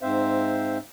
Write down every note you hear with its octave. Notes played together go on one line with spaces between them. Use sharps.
G#2 C4 C5 E5 F5